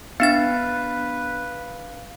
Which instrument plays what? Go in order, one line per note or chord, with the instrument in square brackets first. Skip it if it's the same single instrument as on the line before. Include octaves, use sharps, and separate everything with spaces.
[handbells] B3 D4 A6 [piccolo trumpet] B4 [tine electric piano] F5